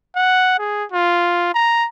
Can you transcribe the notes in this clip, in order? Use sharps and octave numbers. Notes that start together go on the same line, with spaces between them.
F#5
G#4
F4
A#5